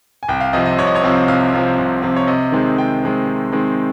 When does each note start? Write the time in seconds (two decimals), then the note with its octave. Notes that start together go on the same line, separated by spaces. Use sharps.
0.23 G#5
0.28 C2 G5
0.41 F5
0.53 C3 F3 C4 D#5
0.66 D#5
0.78 C2 C#5
0.87 D#5
0.95 C#5
1.03 C3 F3 C4
1.28 C2 F5
1.53 C3 F3 C4
1.78 C2
2.02 C3 F3 C4
2.16 C#5
2.27 C3 D#5
2.52 D#3 G#3 C4
2.77 C3 G5
3.03 D#3 G#3 C4
3.27 C3
3.52 D#3 G#3 C4